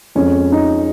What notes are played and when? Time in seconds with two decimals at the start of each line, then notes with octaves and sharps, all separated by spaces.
0.15 F2 F3 G#3 C#4
0.52 D#4